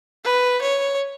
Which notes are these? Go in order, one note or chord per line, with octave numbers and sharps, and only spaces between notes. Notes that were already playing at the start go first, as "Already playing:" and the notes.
B4
C#5